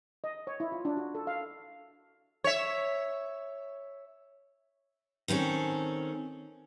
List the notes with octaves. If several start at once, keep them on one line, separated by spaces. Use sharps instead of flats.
D#5
C#5
E4
F4
D4
F#4
A4
F5
C#5 E5
D#3 C4 C#4 A4